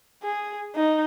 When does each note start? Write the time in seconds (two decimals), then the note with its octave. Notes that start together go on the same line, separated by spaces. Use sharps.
0.23 G#4
0.75 D#4